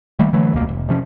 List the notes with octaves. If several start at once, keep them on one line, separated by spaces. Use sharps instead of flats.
D#3 G3 A3 A#3
D3 E3 F#3 A3
E1 C#2 B2 A#3
F1
C3 F3 C#4